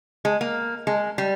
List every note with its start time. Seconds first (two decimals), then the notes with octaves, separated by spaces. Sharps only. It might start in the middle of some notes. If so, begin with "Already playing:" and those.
0.25 G#3
0.41 A#3
0.87 G#3
1.18 G3